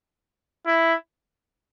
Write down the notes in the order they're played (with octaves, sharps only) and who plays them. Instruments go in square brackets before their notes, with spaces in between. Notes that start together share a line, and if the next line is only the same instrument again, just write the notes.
[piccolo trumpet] E4